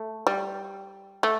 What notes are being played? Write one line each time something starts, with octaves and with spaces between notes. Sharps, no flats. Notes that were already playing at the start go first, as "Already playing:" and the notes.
Already playing: A3
G3
A3